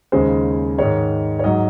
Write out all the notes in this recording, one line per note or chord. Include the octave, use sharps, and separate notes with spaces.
D#2 C#3 G#3 C5
G#2 D#3 G#3 C#5
C#5
G#2 F#3 D#5